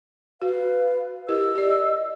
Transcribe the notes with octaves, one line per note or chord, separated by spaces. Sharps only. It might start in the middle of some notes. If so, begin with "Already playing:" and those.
F#4 B4 F5
E4 G4 A#4 D#5 E6
G4 D5